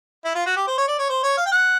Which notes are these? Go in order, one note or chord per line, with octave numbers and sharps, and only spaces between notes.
E4
F4
F#4
G4
C5
C#5
D5
C#5
C5
C#5
F5
G5
F#5